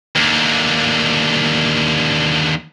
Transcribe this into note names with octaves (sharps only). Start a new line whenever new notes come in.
D#2 D3